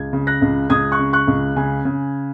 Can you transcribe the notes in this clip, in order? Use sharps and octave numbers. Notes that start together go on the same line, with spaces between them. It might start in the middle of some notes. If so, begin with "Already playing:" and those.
Already playing: C#2 G#6
C#3
F#6 A#6
C#2
C#2 D#6 G#6
C#6 F#6
C#3
C#6 F#6
C#2
C#3 G#5
C#3